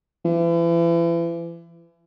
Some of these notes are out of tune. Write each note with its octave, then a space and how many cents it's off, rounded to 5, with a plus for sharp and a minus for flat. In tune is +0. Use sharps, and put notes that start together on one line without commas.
E3 +35